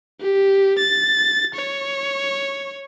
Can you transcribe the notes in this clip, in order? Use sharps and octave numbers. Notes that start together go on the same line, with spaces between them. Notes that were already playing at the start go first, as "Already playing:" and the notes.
G4
A6
C#5